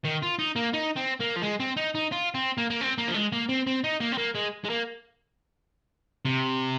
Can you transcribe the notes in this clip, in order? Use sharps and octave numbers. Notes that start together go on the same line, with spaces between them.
D#3
F4
D#4
A#3
D#4
C4
A#3
F3
G#3
C4
D#4
D#4
F4
C4
A#3
A#3
C4
A#3
F3
G#3
A#3
C4
C4
D#4
A#3
C4
A#3
G#3
G#3
A#3
C3